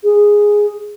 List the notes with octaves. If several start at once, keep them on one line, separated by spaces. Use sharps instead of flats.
G#4